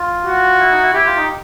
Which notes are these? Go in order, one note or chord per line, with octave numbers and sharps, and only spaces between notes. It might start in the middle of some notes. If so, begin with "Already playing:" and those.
Already playing: F4
F#4
E4
D#4
E4
E4 G4
F4
D#4